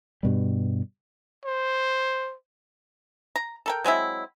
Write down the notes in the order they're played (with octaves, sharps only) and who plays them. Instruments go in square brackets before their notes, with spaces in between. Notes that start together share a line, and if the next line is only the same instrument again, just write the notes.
[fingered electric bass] G2 B2 G3
[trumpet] C5
[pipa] A#5
A4 A#4 G5
F#3 G#3 C4 E4